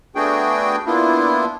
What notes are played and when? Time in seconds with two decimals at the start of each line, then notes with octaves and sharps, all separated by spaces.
0.16 A3 B3 D4 F#4 G#4 G5
0.86 A#3 B3 D4 E4 F4